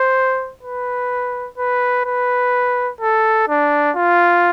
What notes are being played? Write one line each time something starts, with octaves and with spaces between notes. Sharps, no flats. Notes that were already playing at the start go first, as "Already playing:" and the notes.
Already playing: C5
B4
B4
B4
A4
D4
F4